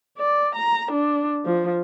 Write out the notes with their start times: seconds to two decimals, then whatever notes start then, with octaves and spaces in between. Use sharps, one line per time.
0.18 D5
0.55 A#5
0.91 D4
1.45 F3